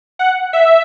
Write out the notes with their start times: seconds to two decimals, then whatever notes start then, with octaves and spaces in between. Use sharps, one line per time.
0.19 F#5
0.53 E5